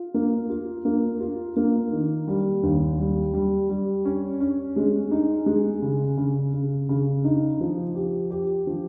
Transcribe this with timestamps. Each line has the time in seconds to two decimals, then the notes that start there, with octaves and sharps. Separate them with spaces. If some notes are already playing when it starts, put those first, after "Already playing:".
Already playing: F4
0.14 A#3
0.50 F4
0.85 A#3
1.20 F4
1.56 A#3
1.92 D#3
2.28 G3
2.63 D#2
2.98 G3
3.33 G3
3.70 G3
4.05 C#4
4.40 C#4
4.76 G#3
5.11 D#4
5.46 G#3
5.82 C#3
6.17 C#3
6.53 C#3
6.89 C#3
7.24 D#4
7.61 F3
7.95 G4
8.31 G4
8.67 F3